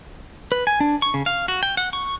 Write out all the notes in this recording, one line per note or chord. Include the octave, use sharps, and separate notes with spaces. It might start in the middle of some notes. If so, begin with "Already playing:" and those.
B4
G#5
D4
C#6
C#3
F5
F#4
G5
F#5
C#6